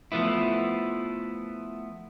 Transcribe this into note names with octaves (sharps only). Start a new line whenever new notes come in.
F3 A3 B3 E4